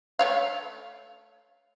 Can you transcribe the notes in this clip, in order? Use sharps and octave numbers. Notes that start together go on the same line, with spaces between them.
A3 C#5 F5